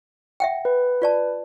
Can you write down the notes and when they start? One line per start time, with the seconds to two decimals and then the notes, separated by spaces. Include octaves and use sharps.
0.40 E5 F#5 G5
0.65 B4
1.02 F4 D5 A5